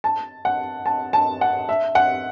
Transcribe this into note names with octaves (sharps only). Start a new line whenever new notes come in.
A5
F#5
A5
A5
F#5
E5
F#5